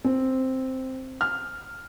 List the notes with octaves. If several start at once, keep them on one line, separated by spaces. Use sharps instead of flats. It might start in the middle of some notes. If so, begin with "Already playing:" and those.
C4
F6